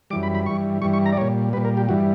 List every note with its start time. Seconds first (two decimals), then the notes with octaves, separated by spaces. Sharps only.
0.10 F#2 E3 G3 D6
0.23 B5
0.35 B5
0.46 G2 E3 G3 C#6
0.82 G2 E3 G3 C#6
0.93 C#6
1.06 A#5
1.13 D5
1.17 A#2 G3 C#5
1.53 G3 B4
1.57 A#2
1.65 A#4
1.77 G4
1.89 G2 E3 G3 F#4